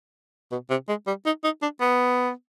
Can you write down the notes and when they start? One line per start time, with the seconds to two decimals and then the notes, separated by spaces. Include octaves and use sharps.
0.51 B2
0.70 C3
0.88 G#3
1.07 G3
1.25 D#4
1.44 D#4
1.62 D4
1.80 B3